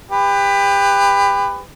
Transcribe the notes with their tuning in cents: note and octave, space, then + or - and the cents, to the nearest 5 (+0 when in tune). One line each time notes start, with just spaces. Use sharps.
G4 +30 B4 +15